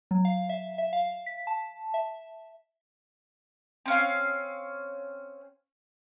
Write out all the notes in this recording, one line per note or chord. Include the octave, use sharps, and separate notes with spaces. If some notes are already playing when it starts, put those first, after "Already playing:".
F#3
F5
E5
E5
F5
B6
A5
E5
C4 C#4 F5